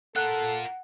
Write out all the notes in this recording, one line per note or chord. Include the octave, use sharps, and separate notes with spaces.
F4 A4 A#4 F#5 F#6